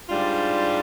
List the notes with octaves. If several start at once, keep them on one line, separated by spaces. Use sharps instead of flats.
G#2 G3 D4 F4